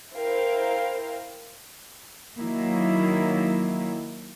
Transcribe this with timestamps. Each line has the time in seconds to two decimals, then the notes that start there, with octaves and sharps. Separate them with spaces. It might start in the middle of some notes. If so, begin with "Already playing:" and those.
0.13 E4 A#4 C5 F5 G5
2.37 D#3 F#3 A#3 E4